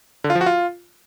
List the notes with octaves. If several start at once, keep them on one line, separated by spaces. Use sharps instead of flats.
D3
F4
F3
F#4
F4